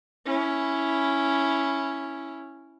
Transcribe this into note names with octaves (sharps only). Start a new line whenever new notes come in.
C#4 E4